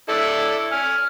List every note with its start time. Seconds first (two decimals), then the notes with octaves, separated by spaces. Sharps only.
0.09 E4 A4 D5
0.72 G#5 F6